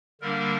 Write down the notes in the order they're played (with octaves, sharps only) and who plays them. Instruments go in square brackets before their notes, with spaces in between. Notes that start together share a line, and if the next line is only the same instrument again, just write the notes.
[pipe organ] D3 G3 A#3 D4 A#4